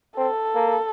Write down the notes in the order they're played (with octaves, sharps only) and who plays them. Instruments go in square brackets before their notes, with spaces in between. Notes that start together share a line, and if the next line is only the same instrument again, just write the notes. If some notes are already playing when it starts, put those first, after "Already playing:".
[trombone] C4 [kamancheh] A4
[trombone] A#3